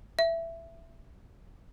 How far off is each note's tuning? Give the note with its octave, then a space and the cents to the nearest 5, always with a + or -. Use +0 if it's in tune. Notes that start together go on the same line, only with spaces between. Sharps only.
E5 +10